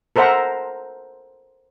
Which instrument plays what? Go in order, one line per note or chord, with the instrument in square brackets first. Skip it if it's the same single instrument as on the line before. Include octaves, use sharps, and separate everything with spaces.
[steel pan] A4 A#4 C5 E5 F#5 A#5